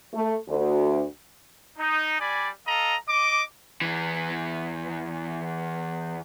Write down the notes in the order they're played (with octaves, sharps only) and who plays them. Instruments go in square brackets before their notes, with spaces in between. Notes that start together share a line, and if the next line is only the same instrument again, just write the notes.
[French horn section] A3
D2
[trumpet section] D#4
G3 D5 G#5 B5
A4 D#5 F5 A#5
D#5 D6
[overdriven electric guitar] E2 E3